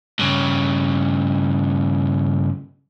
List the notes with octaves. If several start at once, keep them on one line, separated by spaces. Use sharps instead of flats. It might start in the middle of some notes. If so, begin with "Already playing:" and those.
G2 C#3